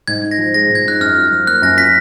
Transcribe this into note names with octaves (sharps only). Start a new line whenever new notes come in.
G#2 G#6
D#4
A#6
F3
G#3 A#6
G#2
G#6
D#4 F#6
F#2 F6
F4
F3
A#3 F#6
F#2 A#6
F4 B6